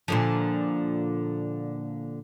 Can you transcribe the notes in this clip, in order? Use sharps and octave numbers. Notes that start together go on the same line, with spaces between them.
A#2 D3 F3